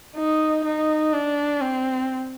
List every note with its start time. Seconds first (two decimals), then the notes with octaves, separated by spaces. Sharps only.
0.16 D#4
0.64 D#4
1.13 D4
1.61 C4